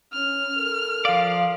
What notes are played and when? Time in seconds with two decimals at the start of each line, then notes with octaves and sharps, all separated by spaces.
0.13 C#4 F6
0.56 A4 A#4
1.05 F3 D5 F5